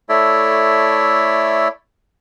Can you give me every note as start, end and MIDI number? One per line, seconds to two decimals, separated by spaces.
0.09 1.68 57
0.09 1.68 64
0.09 1.68 69
0.09 1.68 73
0.09 1.68 74
0.09 1.68 76